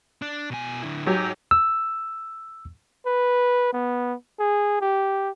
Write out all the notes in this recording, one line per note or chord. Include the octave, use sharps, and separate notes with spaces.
D4
B2 G#5
D3 E4
F#3 D#4 G4 G#4
E6
B4
B3
G#4
G4